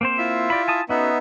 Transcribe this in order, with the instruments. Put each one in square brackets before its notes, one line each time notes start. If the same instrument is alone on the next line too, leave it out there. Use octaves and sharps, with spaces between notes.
[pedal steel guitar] A#3 C4 C5
[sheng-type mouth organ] E4 F4 E5
[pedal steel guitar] G4 D5 B5
G#5 A5 D#6
[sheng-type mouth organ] B3 D#4 E5 [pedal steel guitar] C#4 F#4 A4